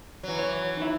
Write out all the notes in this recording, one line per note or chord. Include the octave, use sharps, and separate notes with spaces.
E3 F#3
C#5
D#3 E4